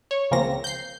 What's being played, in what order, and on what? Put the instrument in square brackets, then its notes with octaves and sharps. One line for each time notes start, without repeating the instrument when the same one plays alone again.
[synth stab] C#5
C#2 C#3 F3 A#3 C4 A#6
G6 C7